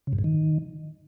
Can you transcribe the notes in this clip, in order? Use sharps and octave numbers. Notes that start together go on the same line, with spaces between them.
C#3
G2
G#2
D#3